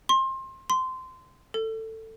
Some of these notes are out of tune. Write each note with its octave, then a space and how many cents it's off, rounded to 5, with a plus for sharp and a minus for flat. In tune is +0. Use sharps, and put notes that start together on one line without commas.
C6 +25
C6 -20
A4 +15